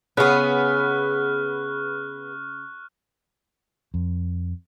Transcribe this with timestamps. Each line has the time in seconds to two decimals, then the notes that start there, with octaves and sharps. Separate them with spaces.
0.17 C#3 B3 G#4 C#6 F6 F#6
3.94 F2